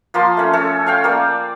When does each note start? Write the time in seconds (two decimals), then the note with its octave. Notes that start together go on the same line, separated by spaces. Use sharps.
0.14 F3 A#3 A5 C6
0.37 A3 C#4
0.53 A3 C#4 A4
0.86 C#5 F5 G5
1.04 A#3 D5